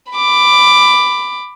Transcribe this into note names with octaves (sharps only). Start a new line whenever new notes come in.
B5 D6